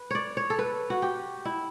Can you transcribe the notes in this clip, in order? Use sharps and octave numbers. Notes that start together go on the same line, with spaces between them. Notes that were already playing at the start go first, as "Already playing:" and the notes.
Already playing: B4
C#5 D5
C#5
A4
B4
F#4
G4
E4